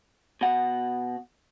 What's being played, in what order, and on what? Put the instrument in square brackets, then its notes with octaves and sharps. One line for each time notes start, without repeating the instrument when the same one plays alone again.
[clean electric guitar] B2 F#5